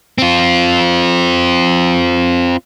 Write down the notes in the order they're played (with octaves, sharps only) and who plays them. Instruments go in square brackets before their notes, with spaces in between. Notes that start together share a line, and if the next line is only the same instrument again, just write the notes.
[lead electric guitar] C4 F4